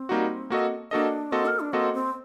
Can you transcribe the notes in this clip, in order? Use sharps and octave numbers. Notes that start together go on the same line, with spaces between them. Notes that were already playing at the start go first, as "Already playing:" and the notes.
Already playing: C4
G3 A#3 D#4 F#4
A#3 F#4 A4 D#5
A#3 D4 F#4 A4 D#5
A#3 C4 F#4 A4 D#5
A#4
D4
A#3 C4 F#4 A4 D#5
C4